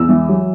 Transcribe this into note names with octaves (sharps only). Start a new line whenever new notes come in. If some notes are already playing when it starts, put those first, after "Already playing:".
Already playing: E2 E6
E3
F#3